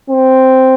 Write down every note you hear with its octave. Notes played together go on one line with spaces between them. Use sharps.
C4